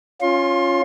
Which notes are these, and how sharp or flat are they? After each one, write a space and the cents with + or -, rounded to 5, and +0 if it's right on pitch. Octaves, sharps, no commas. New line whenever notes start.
C#4 +0 F4 +0 C6 +30